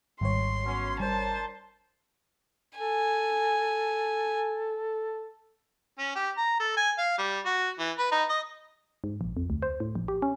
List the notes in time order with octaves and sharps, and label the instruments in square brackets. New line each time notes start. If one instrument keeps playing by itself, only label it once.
[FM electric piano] G#1 C#5 [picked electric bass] G#2 D#3 G3 [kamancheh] C6
[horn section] F#3 B3 C#4
[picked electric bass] G3 [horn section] D4 A#4 C5 [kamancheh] A5
[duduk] A4 [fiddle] G#5
[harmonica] C#4
G4
A#5
A4
G#5
F5
G3
F#4
E3
B4
D#4
D#5
[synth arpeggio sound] G#2
A#1
F2
D2
C5
A2
A#1
G4
C#4